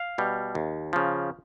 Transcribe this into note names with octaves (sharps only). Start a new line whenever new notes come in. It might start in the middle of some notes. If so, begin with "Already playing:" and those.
Already playing: F5
B2 G3
D#2
C#3 F3